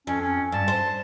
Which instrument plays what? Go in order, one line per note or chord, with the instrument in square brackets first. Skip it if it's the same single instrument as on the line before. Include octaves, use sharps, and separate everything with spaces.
[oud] F2 [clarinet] C#4
[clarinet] C#4
[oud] G2 [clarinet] A5
[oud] C5